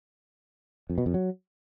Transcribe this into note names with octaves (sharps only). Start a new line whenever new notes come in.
F2
B2
F2
F#3